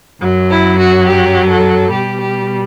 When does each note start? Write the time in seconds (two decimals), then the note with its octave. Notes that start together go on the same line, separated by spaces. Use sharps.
0.21 F#2 F#3
0.49 E4
0.78 F#4
1.06 G4
1.48 A4
1.91 B2 G3 G4
2.20 G4